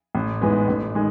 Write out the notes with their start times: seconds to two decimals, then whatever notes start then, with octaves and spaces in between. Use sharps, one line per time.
0.15 A1
0.41 G#2 E3 G#3 B3
0.68 A1
0.95 D#3 G#3